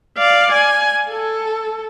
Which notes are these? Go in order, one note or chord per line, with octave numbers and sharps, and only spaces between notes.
D5 F5
G#5
A4